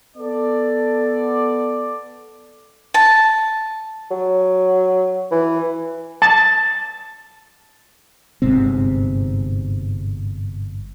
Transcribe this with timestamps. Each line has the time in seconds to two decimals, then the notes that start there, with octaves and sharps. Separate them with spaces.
0.17 B3 A4 D5
2.94 A5
4.11 F#3
5.31 E3
6.22 A5
8.42 G1 G#2 C3 C4